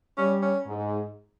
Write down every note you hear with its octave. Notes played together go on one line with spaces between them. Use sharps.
G3 C#4
C#4
G#2